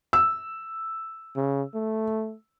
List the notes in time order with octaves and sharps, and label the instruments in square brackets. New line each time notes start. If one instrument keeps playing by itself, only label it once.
[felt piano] E6
[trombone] C#3
A3